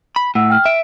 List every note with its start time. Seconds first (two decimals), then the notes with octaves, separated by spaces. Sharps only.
0.16 B5
0.35 A2 F#5 E6
0.50 G5 F6
0.65 E5 D7